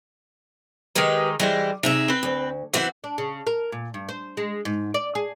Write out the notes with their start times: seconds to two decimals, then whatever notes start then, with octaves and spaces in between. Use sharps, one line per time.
0.95 D#3 G#3 D#4 G4 B4
1.40 E3 G3 G#3 C5
1.83 C3 D#4 G#4 E5
2.08 C4 B4
2.23 D2
2.73 E3 B3 C4 E4 F#4 F#5
3.04 D4
3.18 C#3
3.47 A#4
3.72 A#2
3.94 G2
4.09 C5
4.37 G#3
4.65 G#2
4.94 D5
5.15 G#4